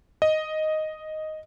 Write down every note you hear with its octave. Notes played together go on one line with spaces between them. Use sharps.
D#5